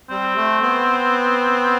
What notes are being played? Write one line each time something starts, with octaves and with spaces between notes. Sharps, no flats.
G3 C4
A3
B3